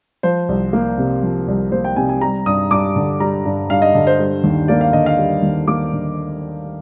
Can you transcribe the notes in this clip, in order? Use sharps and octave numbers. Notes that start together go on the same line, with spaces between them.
F3 C5
C2
A#3
C3
F3
C2
A#3 C5
G5
C3 G#5
G#5
G3 A#5
G2 D#6
G2 D6
D3
G3 A#5
G2
G2 F5
D#5
D3
C5
G3
D#2
A#3 D5
F5
D3 D#5
F5
G3
D#2
A#3 D6
D3